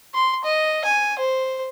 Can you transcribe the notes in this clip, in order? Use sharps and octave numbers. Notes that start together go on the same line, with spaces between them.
C6
D#5
G#5
C5